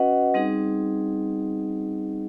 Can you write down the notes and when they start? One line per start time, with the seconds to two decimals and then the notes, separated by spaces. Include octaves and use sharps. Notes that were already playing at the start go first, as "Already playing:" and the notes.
Already playing: C#4 F#4 B4 D#5 F#5
0.34 G3 C4 D#4 G#4